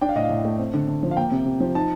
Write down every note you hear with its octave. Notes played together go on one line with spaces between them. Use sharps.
D4 G5
F5
A2 D#5
F5
A2
A3
C4
D3
D3
F3
F5
A#3 G5
C3
C3
F3
D#4 A5